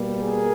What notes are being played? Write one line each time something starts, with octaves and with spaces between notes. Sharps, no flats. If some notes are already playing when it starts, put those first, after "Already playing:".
Already playing: B2 G3 A#3
G#4 A#4